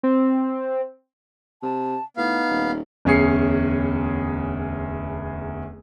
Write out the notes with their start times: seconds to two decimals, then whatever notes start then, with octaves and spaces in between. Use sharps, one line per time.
0.03 C4
1.63 C3 A5
2.17 A2 B3 D#4 F5
2.49 D#1
3.05 D1 E2 C#4 G#4 C7 C#7